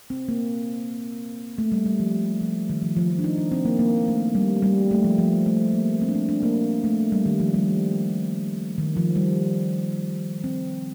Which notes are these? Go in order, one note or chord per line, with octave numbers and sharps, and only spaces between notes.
C4
A#3
A3
G3
G3
F3
F3
D#3
F3
F3
F3
D4
D#4
D4
C4
A#3
A#3
A3
G3
G3
A3
F3
F3
A3
A#3
C4
D4
C4
D4
A#3
A3
G3
D#3
F3
G3
D#3
F3
G3
C4